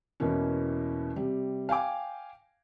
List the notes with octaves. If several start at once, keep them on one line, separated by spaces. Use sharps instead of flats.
E2 B2 E3 A#3 C#4
C3 G3
F5 G5 G#5 D6